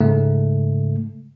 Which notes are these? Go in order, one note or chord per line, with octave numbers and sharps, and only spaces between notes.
G#2 C#3 G#3 A3